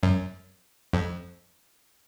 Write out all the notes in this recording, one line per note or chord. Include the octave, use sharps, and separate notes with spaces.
F#2
F2